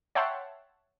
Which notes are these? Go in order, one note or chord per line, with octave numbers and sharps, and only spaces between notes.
C#5 E5 F#5 G5 A5 C6